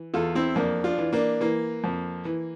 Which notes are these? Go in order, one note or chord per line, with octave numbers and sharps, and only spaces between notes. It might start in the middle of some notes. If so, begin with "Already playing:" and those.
Already playing: E3
E2 F4 A4
C4 E4
F2 A#3 D4
D4 F4
E3
A#3 D4
E3 A#3
F2
E3